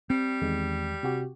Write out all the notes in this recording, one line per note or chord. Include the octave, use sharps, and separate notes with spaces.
G3 C4
E2 D#3 G#3
C3 F#4 G4